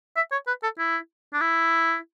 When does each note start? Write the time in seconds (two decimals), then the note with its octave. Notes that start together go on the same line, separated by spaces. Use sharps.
0.16 E5
0.32 C#5
0.47 B4
0.63 A4
0.78 E4
1.33 D4
1.41 E4